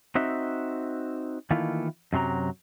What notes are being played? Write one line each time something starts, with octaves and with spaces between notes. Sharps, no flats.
C4 D#4 F#4 E5
D#3 E3 A3 A#3 E4 F4
F#2 C3 F#3 A#5